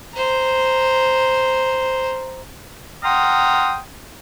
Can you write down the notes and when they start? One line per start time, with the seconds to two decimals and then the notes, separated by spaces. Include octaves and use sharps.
0.13 C5 A#5
3.03 F#5 G5 A#5 C6 D#6 F6